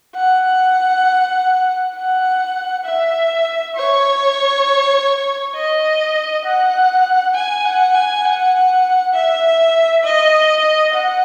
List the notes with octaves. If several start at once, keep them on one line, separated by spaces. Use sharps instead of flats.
F#5
F#5
E5
C#5
D#5
F#5
G#5
F#5
G#5
F#5
E5
D#5
F#5